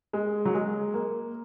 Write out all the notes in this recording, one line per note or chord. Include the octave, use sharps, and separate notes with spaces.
G#3
F#3
G#3
A#3